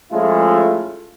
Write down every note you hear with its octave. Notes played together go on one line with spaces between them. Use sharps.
F3 G#3 A3 C#4 E4 F4